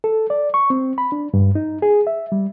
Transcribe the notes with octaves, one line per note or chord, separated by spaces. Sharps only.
A4
D5
C#6
C4
B5
D4
G2
D#4
G#4
E5
G3